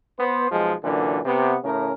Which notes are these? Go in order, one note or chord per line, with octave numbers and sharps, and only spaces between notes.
B3 C5
B1 F3 G#3
F#2 A#2 D3 E3
C3 B3
A2 C#3 C#4 A#4